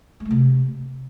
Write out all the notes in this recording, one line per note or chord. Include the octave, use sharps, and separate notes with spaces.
G#3
A3
C3